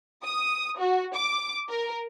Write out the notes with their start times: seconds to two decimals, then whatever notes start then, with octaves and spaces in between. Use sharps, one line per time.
0.23 D#6
0.78 F#4
1.15 D6
1.69 A#4